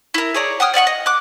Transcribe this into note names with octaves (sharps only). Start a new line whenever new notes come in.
E4 A#4
G#4 C#5 D5 A#5
F#5 G5 D#6 F6
D5 D#5 F#5 C#6
D#5
D6 F#6